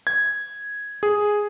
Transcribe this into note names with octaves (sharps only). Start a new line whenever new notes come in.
G#6
G#4